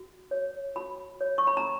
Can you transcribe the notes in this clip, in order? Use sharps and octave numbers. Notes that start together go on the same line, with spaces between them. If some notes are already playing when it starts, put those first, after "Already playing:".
Already playing: F#4
C#5
F#4 B5
C#5
C#6
B5
A#5